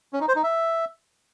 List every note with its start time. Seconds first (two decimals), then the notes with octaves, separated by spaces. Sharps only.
0.13 C#4
0.21 D#4
0.28 C5
0.36 D#4
0.43 E5